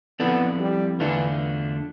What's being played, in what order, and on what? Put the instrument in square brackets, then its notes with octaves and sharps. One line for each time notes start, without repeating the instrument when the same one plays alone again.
[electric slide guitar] F3 C4 E4 A4 D5 [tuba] B3
[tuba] G3
[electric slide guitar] E2 D3 A3 D4 F4 [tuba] E3